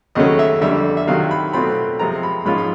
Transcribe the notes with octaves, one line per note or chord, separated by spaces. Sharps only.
D#2 C#3 F#3 A3 C#4 D#5
E5
F2 D3 G3 E5
E5
C3 D#3 F#3 F5
B5
B2 F#3 A3 C4 F4 B5
C3 F3 G#3 C4 F4 A#5
B5
G#2 F3 G#3 C#4 F4 B5
B5